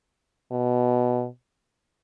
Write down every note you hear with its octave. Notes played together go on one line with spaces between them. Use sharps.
B2